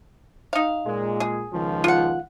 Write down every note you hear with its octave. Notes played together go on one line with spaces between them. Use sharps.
D#4 F5
A#2 G#3
G#4
C#2 D#3 F3
F4 F#5